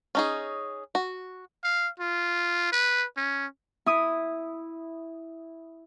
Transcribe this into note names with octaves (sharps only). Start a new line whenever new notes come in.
C#4 D#4 G#4
F#4
F5
F4
B4
C#4
E4 D#6